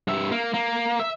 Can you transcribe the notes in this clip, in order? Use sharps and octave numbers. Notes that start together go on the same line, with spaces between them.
G2 E5
A#3
A#3
E5